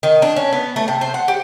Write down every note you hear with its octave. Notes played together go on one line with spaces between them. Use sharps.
D#3
D4
C#4
B3
A3
C3
C5
F#5
G4